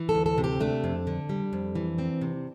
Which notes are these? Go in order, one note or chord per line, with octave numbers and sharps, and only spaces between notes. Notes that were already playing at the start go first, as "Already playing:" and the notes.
Already playing: E3
A4
D2
A4
C3
G4
A3 D4
F2
D3
G3
F2
E3
C4
C3